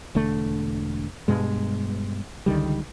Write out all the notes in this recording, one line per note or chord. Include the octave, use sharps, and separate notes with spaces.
E1 D3 A3
G2 B2 G#3
C#2 D3 D#3 G3